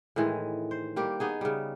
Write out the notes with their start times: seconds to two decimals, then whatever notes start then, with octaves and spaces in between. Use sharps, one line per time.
0.16 A2 D#3 E3 G#3
0.71 C5
0.96 G3 A#3 G4
1.20 B3 D#4 G#4
1.41 C#3 G3